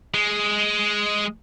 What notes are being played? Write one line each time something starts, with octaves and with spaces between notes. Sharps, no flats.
G#3